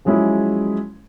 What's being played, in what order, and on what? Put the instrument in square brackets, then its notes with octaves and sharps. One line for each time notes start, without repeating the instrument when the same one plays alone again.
[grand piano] F3 F#3 G#3 C#4 E4 G#4